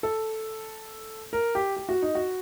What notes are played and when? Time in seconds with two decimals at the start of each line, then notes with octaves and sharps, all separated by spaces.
0.03 A4
1.33 A#4
1.55 G4
1.77 G4
1.89 F#4
2.02 D#4
2.15 F#4